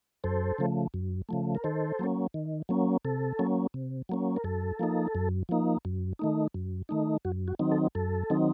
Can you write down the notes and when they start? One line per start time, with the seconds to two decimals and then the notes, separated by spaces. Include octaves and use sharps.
0.24 F#2 A4 C5
0.58 C#3 F3 A3
0.94 F#2
1.29 C#3 F3 A3
1.55 A#4
1.64 D#3 A4 C5
1.99 F#3 A#3 C#4
2.34 D#3
2.69 F#3 A#3 C#4
3.05 C3 A4
3.39 F#3 A#3 C#4
3.74 C3
4.09 F#3 A#3 C#4
4.36 A#4
4.44 F#2 A4
4.79 F3 A#3 D#4
5.15 F#2
5.49 F3 A#3 D#4
5.85 F#2
6.19 D#3 A3 D#4
6.54 F#2
6.89 D#3 A3 D#4
7.25 F#2 F#4
7.48 F#4
7.59 D#3 F#3 C4 D#4
7.72 A4
7.95 F#2 A4
8.30 D#3 F#3 C4 D#4